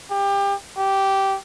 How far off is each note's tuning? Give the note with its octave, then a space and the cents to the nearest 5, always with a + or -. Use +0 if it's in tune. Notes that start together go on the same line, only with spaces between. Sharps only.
G4 +25
G4 -10